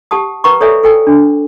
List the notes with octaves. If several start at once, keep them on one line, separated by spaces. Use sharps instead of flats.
G4 F#5 A5 D#6
A#4 B4 F#5 A#5 C#6
A4 C#5 D5 E5 G#5
A4 G5 G#5
D4